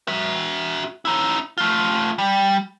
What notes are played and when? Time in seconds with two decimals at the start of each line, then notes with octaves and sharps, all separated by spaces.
0.08 F#4 E5
1.05 D#4 E4
1.58 A3 F4
2.18 G3